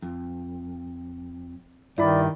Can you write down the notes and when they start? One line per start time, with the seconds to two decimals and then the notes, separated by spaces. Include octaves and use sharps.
0.02 F2
1.98 G2 D#3 E4 D5 B5